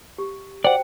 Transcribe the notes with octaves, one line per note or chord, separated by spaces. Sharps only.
G4
F#4 C5 D5 F#5 G5